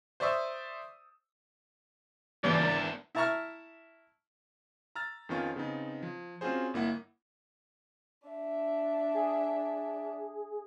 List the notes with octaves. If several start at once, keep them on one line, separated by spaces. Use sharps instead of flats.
C5 D5 E5 C#6 D#6 E6
G1 E2 A#2 C#3 E3 G3 D5 G7
G#1 D4 A#4 A#5
E4 E5 A5 A#5 C#6 F6
A#5 E6 F6 A6
F2 D#3 B3 C#4 F4 C#6
C#3 B3 C4 D#4
F3
C4 C#4 F4 F#4 G#4 C5
G1 A#3 E4 F#5
D4 E5
G#4